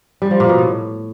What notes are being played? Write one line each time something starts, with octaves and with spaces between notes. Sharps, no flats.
G3
F3
A#2
B2
A2